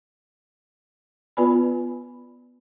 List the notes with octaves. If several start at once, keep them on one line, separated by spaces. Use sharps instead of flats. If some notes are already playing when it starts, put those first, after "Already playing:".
B3 F4 B4 D5 G#5 B5